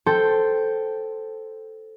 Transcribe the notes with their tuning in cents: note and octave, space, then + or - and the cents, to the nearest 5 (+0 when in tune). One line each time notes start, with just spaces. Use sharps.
A4 +0 C5 +0 G5 +0